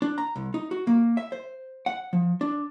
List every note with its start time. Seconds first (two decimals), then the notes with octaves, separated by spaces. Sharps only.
0.02 D4
0.18 A#5
0.36 C2
0.54 D#4
0.71 F#4
0.87 A#3
1.17 E5
1.32 C5
1.86 F#5
2.13 F3
2.41 D4